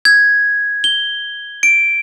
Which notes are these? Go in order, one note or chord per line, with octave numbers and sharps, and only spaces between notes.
G#6
G7
D7